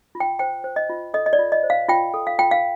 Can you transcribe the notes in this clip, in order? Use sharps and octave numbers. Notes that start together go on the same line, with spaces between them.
F4
G5
C5 G5
C5
D#5
F4
A4 D#5
D#5
D5
F4
D#5
C5
F5
F4 G5
A4
F5
F4 G5
F5